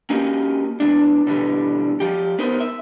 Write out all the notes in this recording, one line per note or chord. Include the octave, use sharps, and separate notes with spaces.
A#3 C#4 D#4 F#4 G4
E2 G#2 D4
B2 D3 E3 G3
F3 G4
B3 D#4 A#4 C5
E5